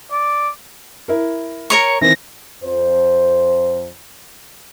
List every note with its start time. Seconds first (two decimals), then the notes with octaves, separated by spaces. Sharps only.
0.12 D5
1.08 E4 A#4
1.70 A#4 C#5 C#6
2.01 D#3 E3 C4 A#6
2.64 F2 C5